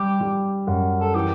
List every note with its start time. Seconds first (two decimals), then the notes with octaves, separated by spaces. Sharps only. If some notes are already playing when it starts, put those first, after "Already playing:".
Already playing: G3 G4
0.21 G3
0.67 F#2
1.01 A4
1.14 E3 G4